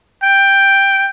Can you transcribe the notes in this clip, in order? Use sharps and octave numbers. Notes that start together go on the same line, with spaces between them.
G5